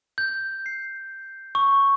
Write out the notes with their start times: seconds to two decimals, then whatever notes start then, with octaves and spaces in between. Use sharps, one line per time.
0.18 G6
0.66 C7
1.55 C#6